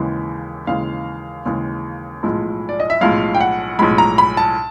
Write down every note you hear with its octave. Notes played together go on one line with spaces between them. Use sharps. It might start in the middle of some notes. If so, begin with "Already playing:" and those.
Already playing: D#2 C#3 E3 G#3
D#2 C#3 E3 G#3 F5
D#2 C#3 E3 G#3
B1 A2 F3 G#3
D5
D#5
E5
B1 A2 F3 G#3 F5
G5
F#5
B1 A2 F3 G#3 B5
A#5
B5
A5